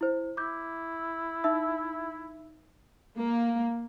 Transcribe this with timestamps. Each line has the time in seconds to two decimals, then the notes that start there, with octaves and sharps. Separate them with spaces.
0.01 E4 C5
0.37 E4 D6 G6
1.44 D#4 E5 E6
3.19 A#3